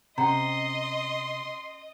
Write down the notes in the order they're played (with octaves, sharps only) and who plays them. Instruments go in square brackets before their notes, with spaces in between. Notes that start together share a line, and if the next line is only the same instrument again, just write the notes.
[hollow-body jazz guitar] C3 [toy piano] C#4 G5 A#5 [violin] D#5 [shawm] C6